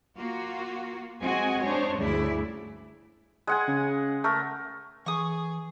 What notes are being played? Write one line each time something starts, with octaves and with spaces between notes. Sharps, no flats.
A#3 F4 F#4
G#3 C4 F#4 D#5 G#5
D4 C5 C#5
D2 G2 C#3 E4 D5
G#3 F#5 G#5
C#3
A3 A#4
E3 G#4 C#6 D#6